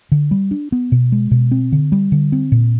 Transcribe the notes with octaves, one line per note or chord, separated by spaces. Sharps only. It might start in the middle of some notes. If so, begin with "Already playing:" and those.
D3
G3
D4
B3
B2
G#3
B2
C4
D3
G3
D3
C4
A#2